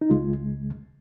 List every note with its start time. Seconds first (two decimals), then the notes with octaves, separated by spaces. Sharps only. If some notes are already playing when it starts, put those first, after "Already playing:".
0.01 D#4
0.10 C#2 C#3 G#3 F4